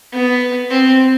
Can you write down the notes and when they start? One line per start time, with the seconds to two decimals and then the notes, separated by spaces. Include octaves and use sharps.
0.12 B3
0.70 C4